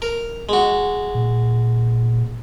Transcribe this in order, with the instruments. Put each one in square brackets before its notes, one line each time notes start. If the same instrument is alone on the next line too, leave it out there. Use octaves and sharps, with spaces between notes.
[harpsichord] A#4
G#3 F#4
[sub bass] A#2